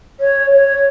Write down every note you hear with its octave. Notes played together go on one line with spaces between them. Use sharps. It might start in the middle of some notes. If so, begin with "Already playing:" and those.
C#5
C#5